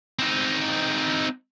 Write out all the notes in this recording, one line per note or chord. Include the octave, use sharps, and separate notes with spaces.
C4 D#4